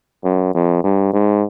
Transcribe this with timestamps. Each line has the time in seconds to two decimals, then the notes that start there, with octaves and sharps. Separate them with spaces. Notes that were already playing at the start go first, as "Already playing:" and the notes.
0.24 F#2
0.54 F2
0.84 G2
1.13 G#2